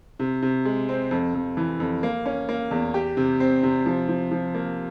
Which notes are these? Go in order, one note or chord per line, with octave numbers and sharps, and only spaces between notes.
C3
C3
G#3
C4
F2
F2
E3
F2
A#3
C#4
A#3
E2
G4
C3
C4
C3
F3
F3
F3
A#3